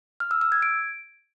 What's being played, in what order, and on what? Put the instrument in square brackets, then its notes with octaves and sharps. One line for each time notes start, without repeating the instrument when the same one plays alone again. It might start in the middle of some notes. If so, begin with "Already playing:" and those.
[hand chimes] F6
E6
E6
G#6
D7